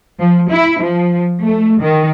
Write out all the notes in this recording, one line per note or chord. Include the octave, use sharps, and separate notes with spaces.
F3
E4
F3
A3
D#3